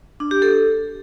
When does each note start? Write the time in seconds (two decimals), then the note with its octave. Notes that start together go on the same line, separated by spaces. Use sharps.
0.20 D4
0.31 G4
0.42 A4